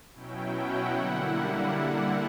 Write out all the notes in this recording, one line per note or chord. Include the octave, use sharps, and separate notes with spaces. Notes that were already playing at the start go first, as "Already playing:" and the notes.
B2 F#3 C#4 E4 G5
F#5
D3 G3 A#3 E4